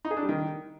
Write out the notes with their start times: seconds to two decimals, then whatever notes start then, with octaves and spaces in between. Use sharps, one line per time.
0.05 D#4
0.11 G#4
0.17 D4
0.23 G3
0.29 D#3